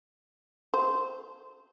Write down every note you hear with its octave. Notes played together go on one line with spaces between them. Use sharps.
C5